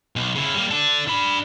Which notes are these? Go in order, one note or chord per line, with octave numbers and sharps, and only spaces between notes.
B1
C#3 E4
G3 A#3
D4 A4
D4 B5